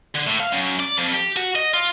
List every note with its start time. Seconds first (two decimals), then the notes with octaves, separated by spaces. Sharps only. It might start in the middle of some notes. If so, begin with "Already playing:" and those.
0.15 D3
0.27 A2
0.40 F5
0.52 F#2
0.79 D5
0.98 F2
1.13 G4
1.37 F#4
1.56 D#5
1.73 F4